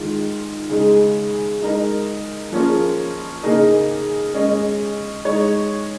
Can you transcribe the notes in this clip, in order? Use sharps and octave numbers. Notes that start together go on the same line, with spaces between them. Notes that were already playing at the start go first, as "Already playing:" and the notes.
Already playing: D#3 G#3 F4
C#3 G#3 D#4 G#4
G#3 D#4 A#4 D#5
F3 A#3 C#4 F4 G#4
C#3 A#3 D#4 G#4 D#5
G#3 C#4 G#4 D#5
G#3 D#4 C#5